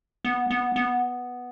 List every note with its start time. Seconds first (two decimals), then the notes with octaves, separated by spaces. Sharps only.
0.25 B3
0.50 B3
0.76 B3